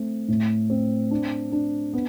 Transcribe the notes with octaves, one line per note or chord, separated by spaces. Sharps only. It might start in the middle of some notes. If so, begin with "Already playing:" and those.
Already playing: A3 C4
A2
C4
D4
D4
B3